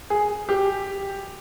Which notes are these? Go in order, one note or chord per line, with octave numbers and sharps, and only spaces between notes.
G#4
G4